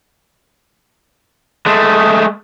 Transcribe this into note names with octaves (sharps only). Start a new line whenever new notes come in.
G#3 A3